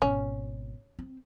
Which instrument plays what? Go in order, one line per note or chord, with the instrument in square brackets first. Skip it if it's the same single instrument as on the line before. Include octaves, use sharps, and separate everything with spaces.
[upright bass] G#1 B2 [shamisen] C#4
[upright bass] C4